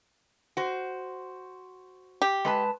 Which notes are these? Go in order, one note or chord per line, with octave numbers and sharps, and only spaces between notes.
F#4 C5
G4
G#3 B4 A5